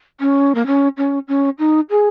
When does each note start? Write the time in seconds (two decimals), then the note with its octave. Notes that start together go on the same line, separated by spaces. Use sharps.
0.20 C#4
0.55 A#3
0.67 C#4
0.97 C#4
1.28 C#4
1.59 D#4
1.90 G#4